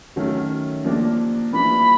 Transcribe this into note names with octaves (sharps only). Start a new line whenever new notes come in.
D#3 F#3 A3 C#4
F3 A#3 D4 G4
E3 G3 A#3 D4 F4 B5